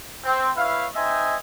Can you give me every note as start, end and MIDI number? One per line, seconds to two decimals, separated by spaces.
0.24 0.49 60
0.57 0.87 64
0.57 0.87 71
0.57 0.87 73
0.57 0.87 76
0.57 0.87 77
0.95 1.35 60
0.95 1.35 63
0.95 1.35 72
0.95 1.35 75
0.95 1.35 76
0.95 1.35 80